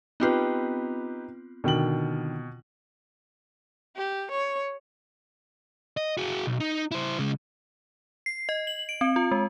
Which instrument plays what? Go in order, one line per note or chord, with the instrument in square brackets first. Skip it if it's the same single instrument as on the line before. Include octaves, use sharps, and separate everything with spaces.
[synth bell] B3 C4 F4 [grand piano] D#4 G4 B4
[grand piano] B2 G5 F#7 [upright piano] D3 D#3
[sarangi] G4
C#5
[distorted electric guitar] D#5
F#4 G#4
B1
D#4
E4 C5
C#3 G#3
[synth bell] C7
D#5
F#7
D7
C4
F4
G#3